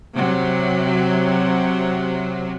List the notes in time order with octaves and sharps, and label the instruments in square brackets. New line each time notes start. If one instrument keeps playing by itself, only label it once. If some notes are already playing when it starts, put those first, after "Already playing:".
[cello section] C3 F#3